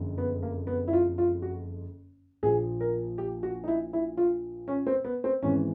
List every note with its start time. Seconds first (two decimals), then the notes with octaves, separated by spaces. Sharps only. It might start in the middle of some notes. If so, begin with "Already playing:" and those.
Already playing: F#1 F2 D3
0.18 B3
0.43 A#3
0.67 B3
0.88 E4
0.93 F4
1.18 F4
1.42 F#4
2.43 A#1 A#2 F3 G#4
2.80 A#4
3.18 G4
3.43 F#4
3.64 D#4
3.68 E4
3.93 E4
4.17 F4
4.68 C#4
4.87 C4
5.05 B3
5.24 C4
5.43 G#1 G#2 E3 C#4